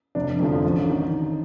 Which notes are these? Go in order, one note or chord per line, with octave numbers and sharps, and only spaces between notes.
F1 D4
F2 D3 F3
A1
D#3